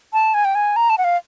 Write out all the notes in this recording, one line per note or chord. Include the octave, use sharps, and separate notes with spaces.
A5
G#5
G5
G#5
A#5
A5
F#5
F5